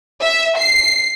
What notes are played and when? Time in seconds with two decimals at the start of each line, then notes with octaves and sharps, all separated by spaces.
0.22 E5
0.58 C7